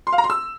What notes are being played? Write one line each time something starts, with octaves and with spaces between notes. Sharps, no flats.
C6
F5
A#5
C6
E6